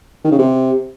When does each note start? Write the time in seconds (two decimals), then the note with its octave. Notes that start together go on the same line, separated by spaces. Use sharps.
0.24 D#3
0.32 C#3
0.39 C3